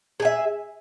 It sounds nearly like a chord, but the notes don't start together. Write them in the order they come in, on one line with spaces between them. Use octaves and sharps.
G#4 G#5 E5